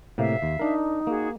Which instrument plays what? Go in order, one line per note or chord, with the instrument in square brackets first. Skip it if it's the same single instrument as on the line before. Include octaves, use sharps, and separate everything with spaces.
[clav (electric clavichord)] A2 C3 A#3 [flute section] E5 F5
[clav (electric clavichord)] D#2
[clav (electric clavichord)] D4 A#4 [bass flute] D#4
[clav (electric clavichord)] A#3 [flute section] F#4 G#4